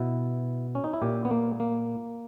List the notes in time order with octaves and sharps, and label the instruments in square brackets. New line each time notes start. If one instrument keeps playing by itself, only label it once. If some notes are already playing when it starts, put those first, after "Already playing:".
Already playing: [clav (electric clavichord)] B2 E4
C#4
D#4
E4
A#2 G4
B3
A#3
A#3